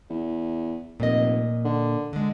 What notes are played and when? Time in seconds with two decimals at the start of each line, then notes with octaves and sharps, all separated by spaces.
0.10 E2
1.00 F1 A#2 D#5
1.65 D3
2.13 D3 G#3